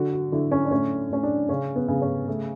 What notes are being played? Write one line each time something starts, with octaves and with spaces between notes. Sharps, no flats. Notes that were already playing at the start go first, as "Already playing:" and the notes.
Already playing: D3 F#4
F#4
D3 E4
C#4
D4
A2 C#4
A2 C#4
D4
C#3 C#4
B3
C#3
C#4
A3